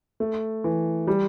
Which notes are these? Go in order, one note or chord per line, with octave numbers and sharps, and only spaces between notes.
A3
E3
G3